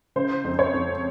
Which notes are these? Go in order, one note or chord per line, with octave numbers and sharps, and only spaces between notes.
C#3 C5
F2
C#5
F2